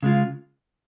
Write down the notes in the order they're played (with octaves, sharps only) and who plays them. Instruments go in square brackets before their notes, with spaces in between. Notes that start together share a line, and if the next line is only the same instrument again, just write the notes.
[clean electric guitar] C#3 G#3 F4